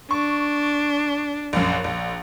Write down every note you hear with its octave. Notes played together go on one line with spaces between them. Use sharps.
D4 C#6
A#1 F#2
A#1